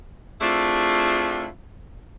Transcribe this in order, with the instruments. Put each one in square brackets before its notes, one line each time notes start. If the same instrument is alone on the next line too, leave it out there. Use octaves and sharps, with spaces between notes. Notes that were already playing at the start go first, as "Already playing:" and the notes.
[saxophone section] A3 C4 D4 E4 F4 G#4